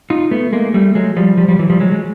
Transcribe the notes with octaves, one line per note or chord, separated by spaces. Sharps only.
D#4 F4
A3 B3
G#3 A#3
G3 A3
F#3 G#3
F3 G3
F3 G3
F3 G3
E3 F#3
F3 G3
F#3 G#3
G#3